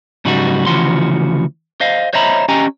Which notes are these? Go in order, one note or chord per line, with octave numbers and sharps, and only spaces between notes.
G#2 C#3 F#3 G3 D#4 F#4
D2 C#3 E3 F3 F#4 C6
C5 D#5 F5
C5 C#5 D#5 E5 A#5 B5
C#4 G4 D#5 G5 G#5 A#5